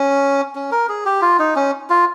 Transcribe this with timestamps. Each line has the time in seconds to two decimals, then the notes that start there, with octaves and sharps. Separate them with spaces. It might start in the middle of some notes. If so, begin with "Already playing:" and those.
Already playing: C#4
0.55 C#4
0.72 A#4
0.89 G#4
1.05 G4
1.22 F4
1.39 D#4
1.56 C#4
1.90 F4